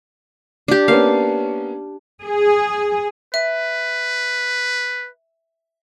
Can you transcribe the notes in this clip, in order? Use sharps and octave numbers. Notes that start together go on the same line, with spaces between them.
D4 G4
A#3 B3 C#4 F5
G#4
B4 E5